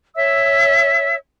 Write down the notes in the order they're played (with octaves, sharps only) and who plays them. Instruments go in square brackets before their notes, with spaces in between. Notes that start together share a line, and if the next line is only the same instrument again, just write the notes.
[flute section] C#5 E5 E6